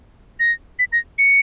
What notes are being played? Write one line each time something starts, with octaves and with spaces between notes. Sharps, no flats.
A#6
B6
A#6
C#7